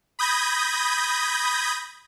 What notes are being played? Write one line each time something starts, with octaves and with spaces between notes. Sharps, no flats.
B5 D#6 G6 G#6 A#6